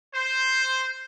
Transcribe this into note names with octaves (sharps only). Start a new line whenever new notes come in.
C5